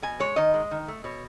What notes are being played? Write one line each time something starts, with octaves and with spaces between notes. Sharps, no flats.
B2 G#5
G#3 C#5
D#3 D#5
G#3
D#3
A3
B2 C#5